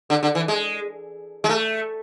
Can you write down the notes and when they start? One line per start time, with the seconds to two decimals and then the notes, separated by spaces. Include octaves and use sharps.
0.10 D3
0.23 D3
0.35 E3
0.48 G#3
1.44 G#3
1.49 A3